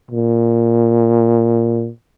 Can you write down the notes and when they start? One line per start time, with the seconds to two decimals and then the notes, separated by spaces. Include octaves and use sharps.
0.11 A#2